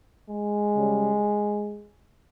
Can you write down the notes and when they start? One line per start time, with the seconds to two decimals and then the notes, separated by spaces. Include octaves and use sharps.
0.29 G#3
0.77 C#3 G3